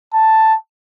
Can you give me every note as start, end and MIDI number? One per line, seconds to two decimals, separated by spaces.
0.14 0.55 81